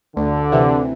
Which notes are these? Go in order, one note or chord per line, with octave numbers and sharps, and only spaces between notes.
D2 D3
C3 E3